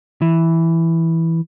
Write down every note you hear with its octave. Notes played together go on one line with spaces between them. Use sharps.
E3